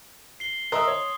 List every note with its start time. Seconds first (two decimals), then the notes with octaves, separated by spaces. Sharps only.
0.40 C7 G7
0.72 A#4 D#5 E5 C6 D#6
0.88 C#5